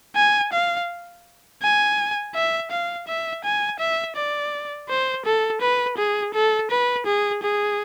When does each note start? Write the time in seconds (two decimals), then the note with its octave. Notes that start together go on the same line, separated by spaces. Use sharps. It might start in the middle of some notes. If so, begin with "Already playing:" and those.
0.16 G#5
0.53 F5
1.62 G#5
2.35 E5
2.71 F5
3.08 E5
3.44 G#5
3.79 E5
4.16 D5
4.89 C5
5.25 A4
5.61 B4
5.97 G#4
6.34 A4
6.71 B4
7.06 G#4
7.43 G#4